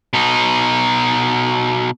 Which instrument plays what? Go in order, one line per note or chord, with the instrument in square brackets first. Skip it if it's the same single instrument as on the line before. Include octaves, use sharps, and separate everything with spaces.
[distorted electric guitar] B2 D#4